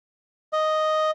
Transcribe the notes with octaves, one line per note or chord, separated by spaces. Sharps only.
D#5